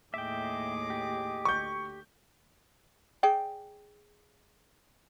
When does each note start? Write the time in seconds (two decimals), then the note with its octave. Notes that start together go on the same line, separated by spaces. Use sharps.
0.14 D#2 A2 G#4 D#5 E5 G5 D6
0.90 G4
1.45 D2 C#6 G6
3.23 G#4 D5 G5